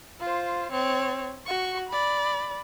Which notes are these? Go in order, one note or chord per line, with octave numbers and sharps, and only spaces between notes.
F4 C5
C4 C#5
F#4 C#6
D5 B5